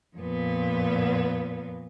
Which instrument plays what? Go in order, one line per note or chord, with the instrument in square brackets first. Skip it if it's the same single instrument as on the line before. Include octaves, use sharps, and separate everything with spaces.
[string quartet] F2 A#2 B3